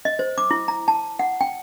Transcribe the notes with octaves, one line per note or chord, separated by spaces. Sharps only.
D#5
C5
D6
E4
A#5
A5
F#5
G5